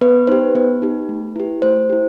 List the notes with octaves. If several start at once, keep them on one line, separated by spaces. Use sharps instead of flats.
B3 B4
D#4 G4 C5
B3 B4
D#4 G4
A3
E4 G4
A3 C5
E4 G4